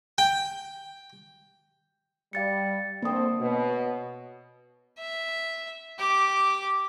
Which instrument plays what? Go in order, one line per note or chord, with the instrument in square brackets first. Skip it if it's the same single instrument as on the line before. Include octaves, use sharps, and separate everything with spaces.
[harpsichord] G5
[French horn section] G3 [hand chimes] F5 A6 C#7
[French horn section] D3 C4 [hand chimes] A#3 D#6
[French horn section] B2 [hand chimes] C#5
[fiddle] E5
G4 D6